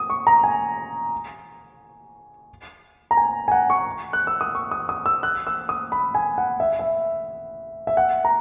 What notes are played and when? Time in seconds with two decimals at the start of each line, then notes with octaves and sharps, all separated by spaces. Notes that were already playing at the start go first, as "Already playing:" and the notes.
Already playing: D#6
0.10 C#6
0.27 A#5
0.43 G#5
3.11 A#5
3.17 G#5
3.48 G#5
3.52 F#5
3.70 C#6
4.13 F#6
4.27 E6
4.41 D#6
4.55 C#6
4.71 D#6
4.89 D#6
5.06 E6
5.23 F#6
5.47 E6
5.69 D#6
5.92 B5
6.15 G#5
6.38 F#5
6.60 E5
6.79 E5
7.87 E5
7.97 F#5
8.25 A#5